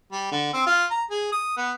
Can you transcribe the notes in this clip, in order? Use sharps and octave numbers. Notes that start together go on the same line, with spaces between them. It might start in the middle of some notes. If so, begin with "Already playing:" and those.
G3
D3
C4
F4
A#5
G#4
D#6
B3